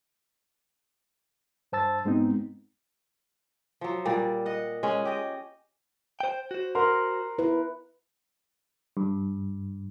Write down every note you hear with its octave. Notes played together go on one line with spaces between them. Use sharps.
G2 C5 A5 E6 A6
G#2 G#3 B3 C4 D#4
F3 F#3
A#2 G3 D5
D#5 F#5
G#3 C#4
G4 D#5
C5 G5
F#4 C5
A#4 F#5 C6
E4 B4
G2